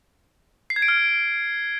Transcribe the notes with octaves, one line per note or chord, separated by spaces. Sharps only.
C7
G#6
D7
F6